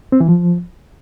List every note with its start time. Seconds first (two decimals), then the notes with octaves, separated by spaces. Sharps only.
0.12 C4
0.20 E3
0.28 F3